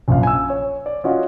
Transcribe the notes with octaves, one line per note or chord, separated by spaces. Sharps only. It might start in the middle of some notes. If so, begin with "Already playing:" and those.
A#1 F#2 F5
G#5 E6
C#5
D5
C#4 F4 F#4 D#5 F5